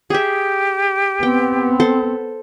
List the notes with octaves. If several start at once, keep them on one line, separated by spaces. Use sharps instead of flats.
G4 G#4 E5
B3 C4 G5
A4 C5